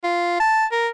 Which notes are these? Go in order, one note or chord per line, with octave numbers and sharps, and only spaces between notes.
F4
A5
A#4